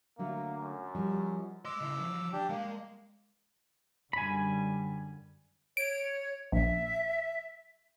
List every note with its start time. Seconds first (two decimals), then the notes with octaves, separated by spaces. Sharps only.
0.19 D3 F#3 A3 A#3
0.58 F#2
0.95 F3 G3 D#4
1.65 D#5 C6 D6 E6
1.80 C#3 E4
2.00 F3 F#3
2.33 D4 G4
2.49 G#3 A#3
4.13 F#2 D3 G3 G#5 B5
5.77 C#5 D7
6.52 A#1 E5